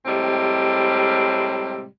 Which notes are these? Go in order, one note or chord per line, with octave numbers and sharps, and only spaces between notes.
A2 C3 G3 G#3 C4